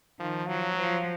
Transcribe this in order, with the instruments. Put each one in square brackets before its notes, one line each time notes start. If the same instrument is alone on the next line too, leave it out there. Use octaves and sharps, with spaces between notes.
[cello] D#3 [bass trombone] F3
[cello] F3 [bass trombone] F#3
[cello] F3